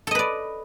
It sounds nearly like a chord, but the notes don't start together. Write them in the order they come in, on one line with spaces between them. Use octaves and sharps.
A4 D#5 B4 D5